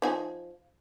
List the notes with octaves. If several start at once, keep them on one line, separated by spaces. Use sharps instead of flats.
F3 D#4 G#5